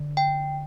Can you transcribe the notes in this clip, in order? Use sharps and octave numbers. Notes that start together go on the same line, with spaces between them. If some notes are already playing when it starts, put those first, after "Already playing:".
Already playing: D3
G5